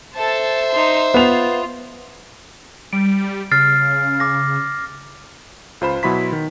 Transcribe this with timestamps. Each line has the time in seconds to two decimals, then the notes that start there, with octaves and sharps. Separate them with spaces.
0.15 A4 C5 E5 A5
0.70 D#4 C6
1.14 B3 F4 F7
2.93 G3 D7
3.51 C#3 F6 A6 C7
4.20 D6 A#6
5.81 C#2 F4 C5 B5 E7
6.03 B2 F#3 E4 B5 C6 B6
6.32 D#3